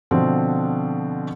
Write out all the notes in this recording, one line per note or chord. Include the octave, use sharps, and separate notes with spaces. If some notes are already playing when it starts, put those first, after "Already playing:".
B2 D3 F3 C4